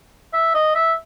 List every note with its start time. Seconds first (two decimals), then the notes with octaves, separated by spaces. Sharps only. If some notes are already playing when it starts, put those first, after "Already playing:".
0.34 E5
0.55 D#5
0.75 E5